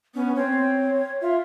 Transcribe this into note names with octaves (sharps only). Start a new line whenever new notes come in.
B3 C#4
C4 C#5
F4 E5